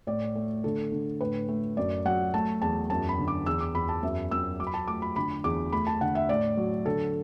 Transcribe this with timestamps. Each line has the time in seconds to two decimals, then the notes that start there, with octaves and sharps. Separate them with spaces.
0.07 A2 D5
0.35 A3
0.64 D3 A4
0.92 D3
1.21 A2 B4
1.49 A3
1.77 F#2 D5
2.05 F#3 F#5
2.34 A3 A5
2.62 E2 A5
2.90 F#2 A5
3.09 B5
3.18 D3
3.28 D6
3.46 E2 E6
3.61 D6
3.75 E2 B5
3.89 A5
4.03 F#2 E5
4.31 F#2 E6
4.60 F#3 D6
4.67 B5
4.74 A5
4.88 A3 D6
5.02 B5
5.16 D3 B5
5.44 E2 D6
5.72 A3 B5
5.87 A5
6.01 D3 F#5
6.15 E5
6.29 A2 D5
6.57 F#3
6.86 D3 A4